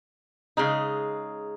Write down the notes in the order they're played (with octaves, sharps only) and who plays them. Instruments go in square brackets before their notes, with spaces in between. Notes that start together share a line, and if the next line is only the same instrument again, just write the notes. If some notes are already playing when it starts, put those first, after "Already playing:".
[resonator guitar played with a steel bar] C#3 G#3 D#4